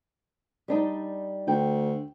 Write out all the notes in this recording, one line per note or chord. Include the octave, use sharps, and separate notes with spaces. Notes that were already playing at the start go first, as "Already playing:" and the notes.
G3 D4 D#4
D2 G5